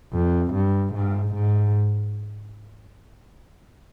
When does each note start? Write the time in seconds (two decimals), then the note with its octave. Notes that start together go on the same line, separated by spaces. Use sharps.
0.13 F2
0.54 G2
0.94 G#2
1.35 G#2